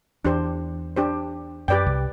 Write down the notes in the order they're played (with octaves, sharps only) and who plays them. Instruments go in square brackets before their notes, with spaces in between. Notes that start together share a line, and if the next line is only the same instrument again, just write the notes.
[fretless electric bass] E2 [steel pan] D4 G4 C5
[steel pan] D4 G4 C5
[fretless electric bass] F#2 [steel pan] G4 B4 D5 G5
[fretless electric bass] C2 C3